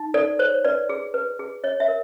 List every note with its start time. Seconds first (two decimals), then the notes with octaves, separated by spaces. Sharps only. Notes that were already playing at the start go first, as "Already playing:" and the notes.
Already playing: D#4
0.14 A4 D5
0.39 C5 C#5
0.64 B4 D5
0.89 G#4
1.14 B4
1.39 G#4
1.64 C#5 D#5
1.80 E5
1.88 A#4